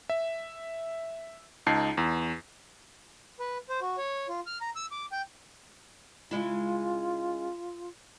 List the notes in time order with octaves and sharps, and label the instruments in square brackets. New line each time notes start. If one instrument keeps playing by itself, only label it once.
[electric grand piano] E5
C#2 D#4 A5 C7
E2
[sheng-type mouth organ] B4
C5
F#4
C#5
F4
F6
A#5
E6
D6
G5
[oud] C#3 G#3 E4 [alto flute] F4